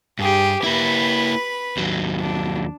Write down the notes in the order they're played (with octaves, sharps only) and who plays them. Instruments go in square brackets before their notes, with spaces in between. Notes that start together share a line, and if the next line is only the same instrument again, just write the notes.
[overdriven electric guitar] G2 [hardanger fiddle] G4 G#4
[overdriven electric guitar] A#3 E4 [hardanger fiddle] B4 B5
[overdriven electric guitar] D#2 F#3
[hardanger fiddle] D4